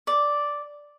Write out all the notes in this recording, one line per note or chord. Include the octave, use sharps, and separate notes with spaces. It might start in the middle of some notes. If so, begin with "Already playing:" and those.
D5